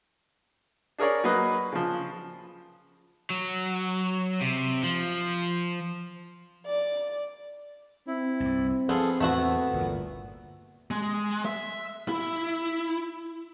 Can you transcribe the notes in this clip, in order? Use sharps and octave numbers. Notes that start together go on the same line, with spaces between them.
D4 G#4 A#4 C#5 D5
F#3 A#3 B4 D#5 D#6 F#6
C#3 F3
F#3
C3
F3
D5
C4 E4
C2 G2
F3 B3 F4 G#4 A4
E2 A2 A3 B3 E4 F#4
G1 D2 A#2
G#3
E5
E4